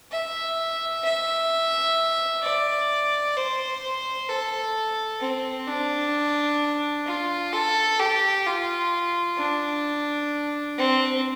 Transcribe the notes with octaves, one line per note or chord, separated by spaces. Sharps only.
E5
E5
D5
C5
A4
C4
D4
F4
A4
G4
F4
D4
C4